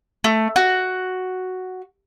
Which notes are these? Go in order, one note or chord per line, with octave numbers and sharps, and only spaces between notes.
A3
F#4